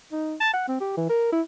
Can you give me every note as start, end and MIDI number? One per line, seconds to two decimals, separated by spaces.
0.12 0.34 63
0.40 0.49 81
0.53 0.66 78
0.68 0.80 60
0.80 0.93 67
0.97 1.06 52
1.09 1.31 70
1.32 1.41 64